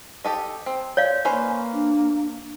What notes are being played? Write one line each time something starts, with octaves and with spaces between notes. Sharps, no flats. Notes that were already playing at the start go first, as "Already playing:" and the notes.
G4 A4 D#5
C4
C#5 D5 F5
A#3 C#4 B4 C5
D4